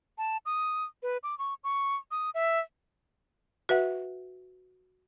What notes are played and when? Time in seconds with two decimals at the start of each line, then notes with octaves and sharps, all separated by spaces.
0.18 A5
0.46 D#6
1.03 B4
1.23 D6
1.39 C#6
1.64 C#6
2.11 D#6
2.34 E5
3.69 F#4 B4 E5 F#5